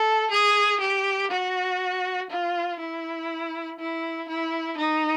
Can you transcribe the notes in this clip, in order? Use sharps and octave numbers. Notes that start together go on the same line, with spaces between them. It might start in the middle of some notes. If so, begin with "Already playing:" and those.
Already playing: A4
G#4
G4
F#4
F4
E4
E4
E4
D#4